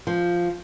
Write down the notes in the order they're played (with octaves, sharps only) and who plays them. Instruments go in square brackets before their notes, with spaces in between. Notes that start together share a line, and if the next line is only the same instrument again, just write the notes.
[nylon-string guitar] F3